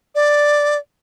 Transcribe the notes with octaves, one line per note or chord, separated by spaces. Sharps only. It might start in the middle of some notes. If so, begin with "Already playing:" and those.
D5